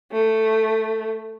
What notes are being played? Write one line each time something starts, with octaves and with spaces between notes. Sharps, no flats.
A3